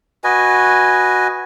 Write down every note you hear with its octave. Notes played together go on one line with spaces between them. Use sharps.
F#4 B4 D#5 G#5